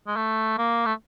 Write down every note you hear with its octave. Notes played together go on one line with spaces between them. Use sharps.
G#3
A3
A#3
A3